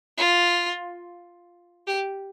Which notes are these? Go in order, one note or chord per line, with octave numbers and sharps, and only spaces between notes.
F4
G4